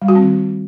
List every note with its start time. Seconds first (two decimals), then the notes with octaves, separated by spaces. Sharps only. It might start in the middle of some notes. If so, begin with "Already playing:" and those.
0.02 G3
0.08 F#4
0.15 C4
0.22 D#3